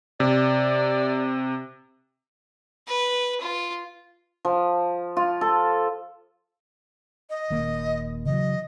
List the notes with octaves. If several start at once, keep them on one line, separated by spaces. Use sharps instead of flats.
C3 D5
B4
F4
F3
F4
A4
D#5
D#1 D#2 A#3
C#3 E3 F#3 D#5